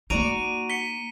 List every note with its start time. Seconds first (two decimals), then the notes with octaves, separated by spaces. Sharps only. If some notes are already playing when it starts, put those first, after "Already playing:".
0.10 A#3 D#4 F#4 D5 A#5 D7 D#7 F7
0.70 B6 C#7 G7